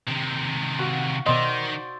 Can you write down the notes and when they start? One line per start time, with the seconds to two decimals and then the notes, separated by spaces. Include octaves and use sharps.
0.07 C3 D#3
0.79 F#4 F5
1.26 B2 D#3 C5 D5 D#5 E6